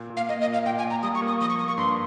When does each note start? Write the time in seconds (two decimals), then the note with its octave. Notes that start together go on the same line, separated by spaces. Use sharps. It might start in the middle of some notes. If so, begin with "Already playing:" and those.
Already playing: A#2
0.10 A#2
0.17 F5
0.29 A#3 D#5
0.41 D#5
0.47 A#2
0.54 F5
0.66 A#2 G5
0.78 G#5
0.84 A#2
0.91 A#5
1.03 G3 D#6
1.15 C#6
1.22 A#3
1.28 D#6
1.41 F3 D#6
1.50 C#6
1.59 A#3 D#6
1.68 C#6
1.78 G2 C6